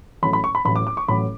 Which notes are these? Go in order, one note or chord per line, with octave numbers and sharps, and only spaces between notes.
A1 A2 F#3 B5
B5
C#6
B5
A1 A2 F#3 B5
D6
D6
C#6
A1 A2 F#3 B5